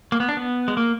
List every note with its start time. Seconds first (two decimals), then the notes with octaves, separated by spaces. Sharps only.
0.12 A#3
0.20 B3
0.29 D4
0.37 B3
0.68 G#3
0.77 A#3